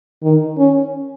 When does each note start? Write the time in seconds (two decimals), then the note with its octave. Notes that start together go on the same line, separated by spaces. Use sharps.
0.23 D#3
0.58 C#4